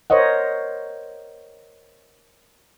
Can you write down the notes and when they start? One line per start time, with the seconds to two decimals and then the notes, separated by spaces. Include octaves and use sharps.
0.10 A#4 C5 C#5 D#5 F#5